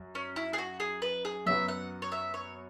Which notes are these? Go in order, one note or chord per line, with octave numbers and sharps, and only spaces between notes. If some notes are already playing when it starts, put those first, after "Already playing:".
Already playing: F#2
C#4
E4
G#4
F#4
G#4
B4
G#4
F#2 F#3 B3 E5
F#5
C#5
E5
C#5